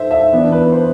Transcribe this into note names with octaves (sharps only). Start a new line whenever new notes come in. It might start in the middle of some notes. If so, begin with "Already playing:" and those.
Already playing: A3 C5 E5
E5
E3 B3 D4
B4
C5